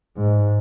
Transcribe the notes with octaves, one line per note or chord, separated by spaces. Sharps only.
G#2